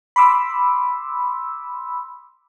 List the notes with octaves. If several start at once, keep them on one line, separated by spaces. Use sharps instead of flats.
B5 C6 D6 E6